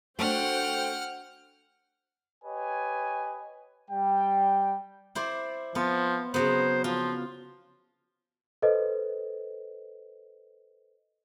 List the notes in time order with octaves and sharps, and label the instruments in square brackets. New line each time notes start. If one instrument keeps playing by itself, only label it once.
[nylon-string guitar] A3 D4 [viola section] F#4 C5 G5 [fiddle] F#5 F6
[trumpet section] G4 B4 C#5 D#5 G#5
G3 G5
[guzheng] E4 C5 D5
[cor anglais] F3 [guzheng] B3
[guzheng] C#3 F#3 B3 [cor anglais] C5
[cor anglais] F3 [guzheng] F4
[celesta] A4 B4 C5 D#5